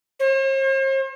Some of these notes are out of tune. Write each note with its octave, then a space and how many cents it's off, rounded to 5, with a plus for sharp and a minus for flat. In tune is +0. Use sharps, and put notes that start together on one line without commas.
C5 +45